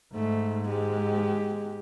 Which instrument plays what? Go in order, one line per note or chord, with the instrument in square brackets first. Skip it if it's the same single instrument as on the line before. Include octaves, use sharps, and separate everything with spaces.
[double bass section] G#2 [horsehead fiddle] A3
[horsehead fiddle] G#3 G4